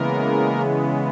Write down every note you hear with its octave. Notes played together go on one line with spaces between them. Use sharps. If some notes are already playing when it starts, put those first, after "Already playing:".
Already playing: C#3 E3 G#3 A#3 B3 A#4